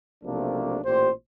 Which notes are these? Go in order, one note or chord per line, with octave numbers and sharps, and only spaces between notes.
B1 C3 F3 A3 A#3 D4
A1 A#2 G4 C5